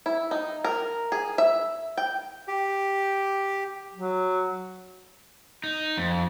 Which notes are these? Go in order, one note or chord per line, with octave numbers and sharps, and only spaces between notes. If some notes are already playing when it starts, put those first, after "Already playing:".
E4
D#4
A#4
G#4
E5
G5
G4
F#3
D#4
F2